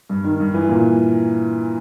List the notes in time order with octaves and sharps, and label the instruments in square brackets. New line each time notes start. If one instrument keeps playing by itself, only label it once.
[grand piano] G2
D#3
G2
E3
A#2